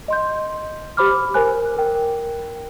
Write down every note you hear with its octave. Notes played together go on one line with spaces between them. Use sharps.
D#5 C6 G6
G4 C5 B5 D6 F6
A#4 C5 G#5 F#6
A#4 G5